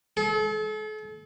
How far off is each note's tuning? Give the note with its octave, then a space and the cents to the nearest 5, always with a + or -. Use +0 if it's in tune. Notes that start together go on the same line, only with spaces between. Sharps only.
A4 -40